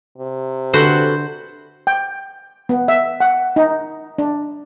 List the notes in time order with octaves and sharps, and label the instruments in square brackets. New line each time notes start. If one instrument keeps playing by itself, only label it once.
[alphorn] C3
[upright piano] D3 [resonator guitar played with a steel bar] F#4 A4 B4 [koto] C5
[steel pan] G5
B3
E5
F#5
D#4
D4